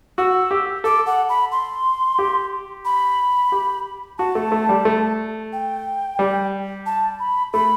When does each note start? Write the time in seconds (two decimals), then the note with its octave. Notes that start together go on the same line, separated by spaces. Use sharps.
0.18 F#4 E6
0.51 G4
0.84 A4 D6
1.07 F#5
1.29 B5
1.52 C6
2.19 G4
2.85 B5
3.52 G4
4.19 F#4 A5
4.35 A3
4.52 A3
4.69 G3
4.85 A3
5.53 G5
6.19 G3
6.86 A5
7.20 B5
7.53 A3 B5